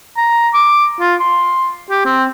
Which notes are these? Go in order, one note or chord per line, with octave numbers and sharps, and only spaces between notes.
A#5
D6
F4
C6
G4
C4